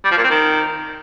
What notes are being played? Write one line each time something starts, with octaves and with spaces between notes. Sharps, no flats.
G3
F3
A#2
C4
D#3